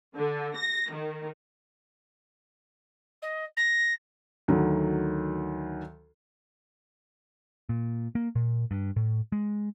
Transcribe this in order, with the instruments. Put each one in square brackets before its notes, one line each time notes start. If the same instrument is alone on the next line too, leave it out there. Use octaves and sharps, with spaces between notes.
[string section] D3
A#6
D#3
[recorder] D#5
A#6
[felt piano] D2 D#3 F#3
[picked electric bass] A#2
A#3
A#2
G2
A2
G#3